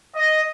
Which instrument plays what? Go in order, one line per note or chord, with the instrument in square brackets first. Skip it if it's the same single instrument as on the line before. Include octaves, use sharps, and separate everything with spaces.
[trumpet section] D#5